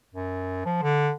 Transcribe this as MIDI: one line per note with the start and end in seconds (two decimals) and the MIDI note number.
0.14 0.65 42
0.65 0.78 53
0.83 1.11 50